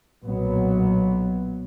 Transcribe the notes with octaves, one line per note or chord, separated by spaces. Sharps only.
B1 A#2 F#3 B3